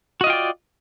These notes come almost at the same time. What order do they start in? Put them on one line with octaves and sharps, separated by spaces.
F#4 D#5 F4 G5 D5